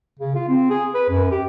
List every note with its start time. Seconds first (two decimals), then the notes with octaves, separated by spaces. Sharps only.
0.19 C#3
0.35 F4
0.48 C4
0.70 G#4
0.94 B4
1.10 F#2
1.32 G4